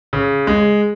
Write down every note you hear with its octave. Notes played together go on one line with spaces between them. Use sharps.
C#3
G#3